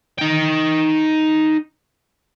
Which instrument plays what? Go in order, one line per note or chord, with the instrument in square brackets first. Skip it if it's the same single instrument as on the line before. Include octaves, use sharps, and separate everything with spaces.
[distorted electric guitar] D#4 G5